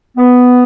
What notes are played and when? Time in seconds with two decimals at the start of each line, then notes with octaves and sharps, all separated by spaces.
0.17 B3